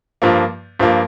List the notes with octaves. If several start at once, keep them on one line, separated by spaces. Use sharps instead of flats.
G2 F3 A#3
G2 F3 A#3